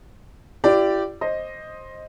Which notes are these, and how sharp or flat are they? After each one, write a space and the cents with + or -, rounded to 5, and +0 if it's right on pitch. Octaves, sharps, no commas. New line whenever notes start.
E4 +40 G4 -15 D5 +0
C5 +10 D#5 +0